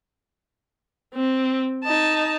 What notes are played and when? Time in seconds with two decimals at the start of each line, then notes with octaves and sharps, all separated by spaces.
1.14 C4
1.84 D#4 A5